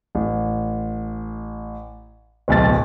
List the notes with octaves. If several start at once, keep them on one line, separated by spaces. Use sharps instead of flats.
A1
D1 B1 A6